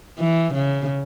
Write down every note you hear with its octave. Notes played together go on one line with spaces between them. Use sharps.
E3
C#3